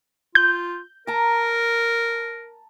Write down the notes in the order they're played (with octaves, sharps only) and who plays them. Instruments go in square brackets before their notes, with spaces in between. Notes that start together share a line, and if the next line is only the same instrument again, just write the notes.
[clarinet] F4 [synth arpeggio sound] G6
[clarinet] A#4 [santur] A5 A#5